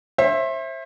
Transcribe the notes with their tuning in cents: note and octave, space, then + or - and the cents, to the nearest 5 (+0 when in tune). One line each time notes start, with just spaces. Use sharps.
C5 +35 E5 +0